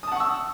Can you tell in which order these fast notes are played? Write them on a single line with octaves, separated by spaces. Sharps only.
D#6 A5 F#5 C#6 E6